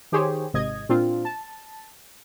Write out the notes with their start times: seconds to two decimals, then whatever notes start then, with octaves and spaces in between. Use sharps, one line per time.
0.12 D#3 G4 G#4 C5 C#5
0.53 G#1 C3 D#5 G#6
0.89 A#2 C4 D4 F4
1.25 A5